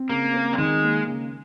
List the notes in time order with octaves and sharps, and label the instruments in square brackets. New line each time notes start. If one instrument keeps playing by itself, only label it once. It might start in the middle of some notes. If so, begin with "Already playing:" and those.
Already playing: [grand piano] C4
[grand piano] C#3 [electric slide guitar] A#3
[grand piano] C4
[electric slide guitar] G3
[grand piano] D#3 [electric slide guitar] G#3
[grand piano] A#3
C#3